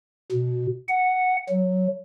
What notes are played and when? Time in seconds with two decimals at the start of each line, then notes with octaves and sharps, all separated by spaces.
0.32 B2
0.89 F#5
1.49 F#3